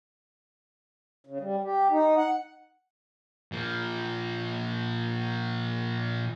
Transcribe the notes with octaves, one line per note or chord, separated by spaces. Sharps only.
C#3
G3
G4
D#4
F#5
A#2 F3